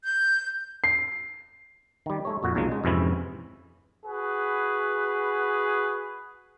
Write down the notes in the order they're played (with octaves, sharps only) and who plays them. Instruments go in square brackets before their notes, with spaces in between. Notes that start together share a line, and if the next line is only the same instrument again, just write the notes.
[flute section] G6
[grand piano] C7
[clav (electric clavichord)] D#3 G3
G#3 A3 C#5
F2 A#2 F#4
B1 A#2 C#3 F#3 G#3
G#3
F2 G#2 C3 E3 C#4 E4
[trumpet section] F#4 G#4 B4